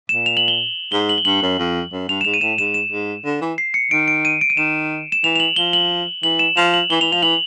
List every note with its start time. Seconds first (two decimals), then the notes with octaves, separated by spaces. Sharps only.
0.09 A#2 E7
0.26 F7
0.37 F#7
0.48 G7
0.92 G#2 G7
1.09 F#7
1.18 G7
1.25 G2 F#7
1.42 F#2
1.58 F2
1.92 F#2
2.08 G2 F7
2.21 E7
2.25 G#2 F7
2.34 D#7
2.41 A2 E7
2.58 G#2 E7
2.74 E7
2.92 G#2
3.25 D3
3.41 E3
3.58 C7
3.74 C#7
3.91 D#3 D7
4.08 D7
4.25 D#7
4.41 D7
4.50 D#7
4.57 D#3 E7
5.12 E7
5.24 E3 F7
5.36 F7
5.40 F#7
5.56 F3 G7
5.73 F#7
6.23 E3 F#7
6.39 E7
6.57 F3 F7
6.74 F#7
6.90 E3 G7
7.01 E3 F7
7.12 F3 F7
7.23 E3 F#7